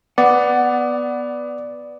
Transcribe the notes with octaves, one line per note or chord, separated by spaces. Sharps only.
B3 D5 F#5